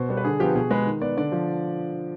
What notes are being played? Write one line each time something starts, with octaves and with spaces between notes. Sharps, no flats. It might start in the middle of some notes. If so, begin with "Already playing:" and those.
Already playing: B2 C5
G3 B3
B4
D3 G#4
F3 B3 G4
B2 G#4
G#3 B3 B4
D#3
B3 D5
D3 D5
F3